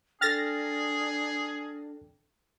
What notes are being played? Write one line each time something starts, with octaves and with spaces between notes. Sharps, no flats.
D4 G#4 A4 G5 F6 A6 A#6